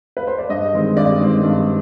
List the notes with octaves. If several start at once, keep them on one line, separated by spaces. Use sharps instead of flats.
B4
C5
D5
G2 D#5
D#3 G#3 C4
G2 D5
D#3 G#3 C4
G2